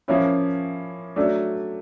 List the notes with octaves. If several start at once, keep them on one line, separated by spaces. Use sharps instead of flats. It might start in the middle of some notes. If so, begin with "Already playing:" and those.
F3 A#3 C#4 E4
F#3 A3 D4